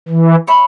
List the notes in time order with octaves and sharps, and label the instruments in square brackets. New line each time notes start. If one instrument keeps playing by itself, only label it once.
[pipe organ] E3
[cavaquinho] C#5 E5 B5